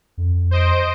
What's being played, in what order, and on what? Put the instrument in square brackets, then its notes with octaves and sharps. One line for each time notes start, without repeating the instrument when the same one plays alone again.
[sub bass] F2
[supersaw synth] C5 D#5 D7